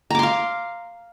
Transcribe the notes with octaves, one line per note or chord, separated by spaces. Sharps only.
F5 A#5 C6 D6